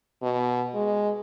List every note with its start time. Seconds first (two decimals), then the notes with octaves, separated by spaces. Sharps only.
0.22 B2
0.75 G#3